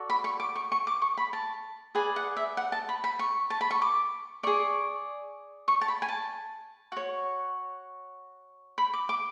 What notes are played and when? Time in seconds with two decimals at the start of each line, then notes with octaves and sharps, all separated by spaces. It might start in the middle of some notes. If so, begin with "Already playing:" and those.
Already playing: F#4 A4 D5
0.10 B5
0.24 C#6
0.40 D6
0.56 C#6
0.72 C#6
0.87 D6
1.02 C#6
1.17 B5
1.33 A5
1.95 G#4 B4 D5 G#5
2.16 F#5
2.37 E5
2.57 F#5
2.72 A5
2.89 B5
3.04 B5
3.19 C#6
3.50 A5
3.61 B5
3.71 C#6
3.82 D6
4.43 G#4 D5 C#6
5.68 C#6
5.81 A5
5.88 B5
6.02 G#5
6.09 A5
6.92 F#4 C#5
8.78 B5
8.94 D6
9.09 D6